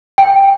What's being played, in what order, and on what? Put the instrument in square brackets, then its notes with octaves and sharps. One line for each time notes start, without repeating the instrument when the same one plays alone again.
[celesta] G5